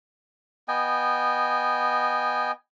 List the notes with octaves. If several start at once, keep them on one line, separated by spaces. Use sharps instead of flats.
B3 D#5 G5 G#5